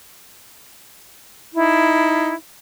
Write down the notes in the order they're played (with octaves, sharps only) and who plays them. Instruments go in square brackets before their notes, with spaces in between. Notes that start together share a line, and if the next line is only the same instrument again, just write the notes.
[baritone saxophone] D#4 [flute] E4